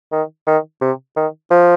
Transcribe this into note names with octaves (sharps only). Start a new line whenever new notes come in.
D#3
D#3
C3
D#3
F3